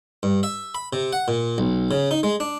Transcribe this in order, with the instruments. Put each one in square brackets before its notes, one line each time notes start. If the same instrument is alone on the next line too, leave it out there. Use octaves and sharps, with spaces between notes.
[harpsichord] G2
E5
B5
C3
F#5
A#2
B1
C#3
D#4
G#3
D4